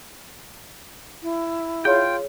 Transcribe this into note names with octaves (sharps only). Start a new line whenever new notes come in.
E4
F4 G#4 C#5 G5